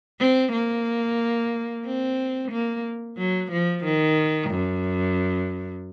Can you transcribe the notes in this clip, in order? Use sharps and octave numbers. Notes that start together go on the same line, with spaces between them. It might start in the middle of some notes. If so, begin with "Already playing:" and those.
C4
A#3
C4
A#3
F#3
F3
D#3
F#2